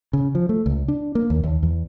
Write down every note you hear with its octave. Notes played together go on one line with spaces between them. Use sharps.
C#3
F3
A3
C#2
D4
A#3
D#2
D#2
E2